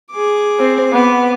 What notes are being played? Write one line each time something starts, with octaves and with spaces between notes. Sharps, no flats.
G#4 D6
C4
B3 D6